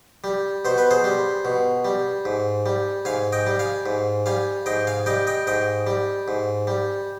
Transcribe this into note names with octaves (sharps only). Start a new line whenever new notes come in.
G3
B2 C5
B4
G#4 C5
G3
B2
G3
G#2
G3
G#2 F5 G#5
D#5 G5
G3
F5 G#5
G#2
G3 F5 G#5
G#2 D#5 G5
F5 G#5
G3 D#5 G5
D#5 G5
G#2 D#5 G5
G3
G#2
G3